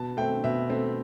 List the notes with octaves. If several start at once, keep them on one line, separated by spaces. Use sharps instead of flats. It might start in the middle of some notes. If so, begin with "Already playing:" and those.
Already playing: B2 A5
A3 C4 G5
B2 E5
A3 C4